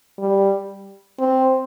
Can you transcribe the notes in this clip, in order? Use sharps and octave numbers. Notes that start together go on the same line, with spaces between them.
G3
C4